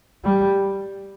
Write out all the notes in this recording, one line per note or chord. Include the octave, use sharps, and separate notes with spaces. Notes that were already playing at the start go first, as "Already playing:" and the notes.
G3